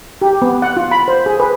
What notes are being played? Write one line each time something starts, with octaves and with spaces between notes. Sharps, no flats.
G4
B3
F#5
F4
B5
C5
G#4
B4